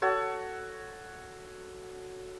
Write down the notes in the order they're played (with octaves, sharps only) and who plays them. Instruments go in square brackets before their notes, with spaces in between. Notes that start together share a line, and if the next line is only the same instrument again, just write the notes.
[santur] F#4 A4 C#5